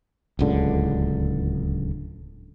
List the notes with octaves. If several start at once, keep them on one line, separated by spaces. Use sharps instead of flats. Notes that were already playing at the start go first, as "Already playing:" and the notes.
D1 C#2 D3